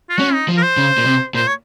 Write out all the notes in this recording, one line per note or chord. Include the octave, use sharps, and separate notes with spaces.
F4
C#4 F#4
D#4
F3
A#4
C5
C#3
A#2
C3
A#2 C5
C#5